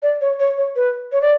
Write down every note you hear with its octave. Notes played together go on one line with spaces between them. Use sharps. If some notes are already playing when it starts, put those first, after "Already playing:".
D5
C#5
C#5
C#5
B4
C#5
D5